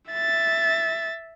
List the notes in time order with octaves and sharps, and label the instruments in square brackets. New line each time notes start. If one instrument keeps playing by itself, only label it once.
[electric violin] E5 A6